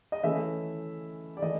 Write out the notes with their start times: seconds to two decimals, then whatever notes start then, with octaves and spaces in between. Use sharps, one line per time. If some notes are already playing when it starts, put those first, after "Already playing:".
0.12 D#5
0.24 E3 A3 C#4 E5
1.37 D5
1.42 E3 A3 D#5